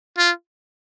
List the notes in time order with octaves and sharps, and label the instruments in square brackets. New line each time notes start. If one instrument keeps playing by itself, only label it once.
[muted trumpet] F4